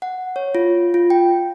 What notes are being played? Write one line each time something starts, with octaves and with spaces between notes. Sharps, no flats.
F#5
C#5
F4
F4
G5